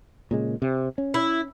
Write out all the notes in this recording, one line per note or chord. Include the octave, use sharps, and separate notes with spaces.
A#2 C#3 G#3
C3
C#4
E4